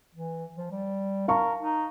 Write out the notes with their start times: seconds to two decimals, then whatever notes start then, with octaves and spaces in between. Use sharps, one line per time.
0.15 E3
0.57 F3
0.71 G3
1.28 A#4 F5 A5 C#6
1.60 D#4